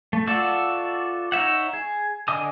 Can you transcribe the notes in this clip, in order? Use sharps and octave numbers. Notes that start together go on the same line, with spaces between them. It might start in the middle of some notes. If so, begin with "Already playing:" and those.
A3
F4 F#4 A4 D5 E5
D#4 C#5 E5 F#5
G#4
D3 D#5 G#5 D6 D#6